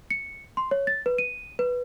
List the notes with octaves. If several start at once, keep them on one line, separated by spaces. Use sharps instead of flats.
C#7
C6
C#5
A6
B4
D#7
B4